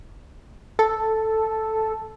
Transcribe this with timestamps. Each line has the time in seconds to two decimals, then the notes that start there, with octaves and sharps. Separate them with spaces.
0.79 A4